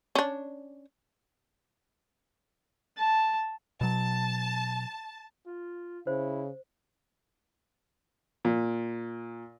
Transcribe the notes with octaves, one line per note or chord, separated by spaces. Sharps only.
C#4 D4
A5
B2 F#3 A5
F4
C#3 E4 C5
A#2